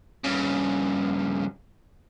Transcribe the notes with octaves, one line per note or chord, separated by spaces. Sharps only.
G2 C#3